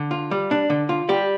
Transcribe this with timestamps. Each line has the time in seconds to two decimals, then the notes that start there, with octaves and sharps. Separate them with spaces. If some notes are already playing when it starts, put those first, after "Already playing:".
Already playing: D3
0.11 F4
0.31 G3
0.51 D4
0.70 D3
0.89 F4
1.09 G3 G4